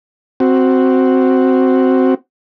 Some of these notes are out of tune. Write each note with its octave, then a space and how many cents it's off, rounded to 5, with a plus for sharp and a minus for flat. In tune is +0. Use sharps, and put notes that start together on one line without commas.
C4 +0 F#4 +0